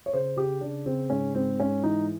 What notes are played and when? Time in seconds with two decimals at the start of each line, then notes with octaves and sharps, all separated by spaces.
0.06 C#5
0.13 C#3 C5
0.37 C#3 G4
0.61 C#3 D4
0.86 C#3 C4
1.10 G#2 C#4
1.34 G#2 C4
1.59 G#2 C#4
1.83 E3 D#4